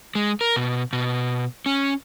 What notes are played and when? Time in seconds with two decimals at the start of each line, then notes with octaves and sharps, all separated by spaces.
0.15 G#3
0.41 A#4
0.56 B2
0.93 B2
1.66 C#4